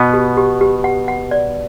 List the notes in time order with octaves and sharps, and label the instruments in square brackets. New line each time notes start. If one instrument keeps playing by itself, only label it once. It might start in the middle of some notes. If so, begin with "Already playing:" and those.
Already playing: [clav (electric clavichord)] B2 B3
[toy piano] G4
G4
G4
F#5
F#5
D5